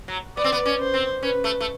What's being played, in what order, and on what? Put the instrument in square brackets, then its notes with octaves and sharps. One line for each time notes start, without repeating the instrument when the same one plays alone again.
[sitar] F#3
[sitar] B3 [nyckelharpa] D5
[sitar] C4
B3
C#4
[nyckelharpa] C5
[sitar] C4
[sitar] C#4 [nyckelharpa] B4
[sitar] A3
A3